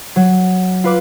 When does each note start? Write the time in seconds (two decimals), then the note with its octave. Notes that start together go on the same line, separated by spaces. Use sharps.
0.16 F#3
0.84 F4 B4 D6